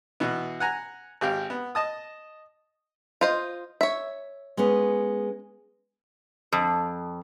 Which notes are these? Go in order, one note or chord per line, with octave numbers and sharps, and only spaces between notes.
B2 E3 B3
F#5 G#5 A#5
G#1 G4 F5 G5
B3
D#5 A5 D#6
F4 C5 D#5
C#5 E5
G#3 B3 C#4
F2